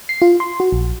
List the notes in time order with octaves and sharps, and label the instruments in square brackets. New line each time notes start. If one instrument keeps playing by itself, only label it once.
[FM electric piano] C7
F4
C6
F#4
A#1